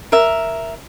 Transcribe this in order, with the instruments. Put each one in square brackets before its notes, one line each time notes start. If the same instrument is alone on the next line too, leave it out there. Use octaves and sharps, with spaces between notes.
[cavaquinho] A#4 E5